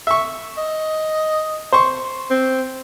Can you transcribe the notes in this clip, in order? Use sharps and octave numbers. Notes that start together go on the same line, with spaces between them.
E5 C#6
D#5
C5 C6 C#6
C4